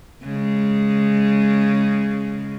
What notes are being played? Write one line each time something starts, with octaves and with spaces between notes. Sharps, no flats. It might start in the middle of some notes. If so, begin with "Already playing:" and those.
C#3 G#3